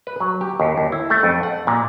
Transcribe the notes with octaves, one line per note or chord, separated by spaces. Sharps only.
B4
F#3
G4
D#2
D#2
E4
A3
F2
F#5
A#2